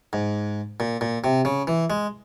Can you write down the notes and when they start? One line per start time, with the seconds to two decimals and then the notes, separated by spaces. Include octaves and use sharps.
0.13 G#2
0.80 A#2
1.01 A#2
1.24 C3
1.45 C#3
1.67 E3
1.90 G#3